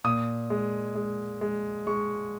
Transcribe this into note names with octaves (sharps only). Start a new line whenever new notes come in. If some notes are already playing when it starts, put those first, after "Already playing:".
A#2 D#6
G#3
G#3
G#3
G#3 C#6